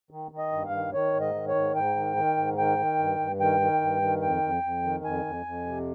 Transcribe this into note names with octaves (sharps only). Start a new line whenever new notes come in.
D#3
D#3
D#5
G2
F5
D#3
D#3 C#5
G#2
D#5
D#3
C#5
G#2
G#2 G5
D#3
D#3
G#2
D#3 G5
D#3
G2
G2
D#3 G5
D#3
G2
D#3
F2 G5
F2
F2
D#3
F2 G#5
F2
F2
C3